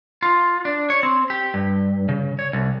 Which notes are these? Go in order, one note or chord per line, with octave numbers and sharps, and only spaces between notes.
F4
D4
C#5
C4
G4
G2
C#3
C#5
C2